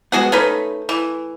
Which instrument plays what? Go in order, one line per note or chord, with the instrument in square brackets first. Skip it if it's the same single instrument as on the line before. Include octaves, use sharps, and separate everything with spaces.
[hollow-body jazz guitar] G#3 B3 [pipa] F#4 G#4 F#5
[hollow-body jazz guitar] A3 [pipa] C#4 D#4 B4
[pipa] E3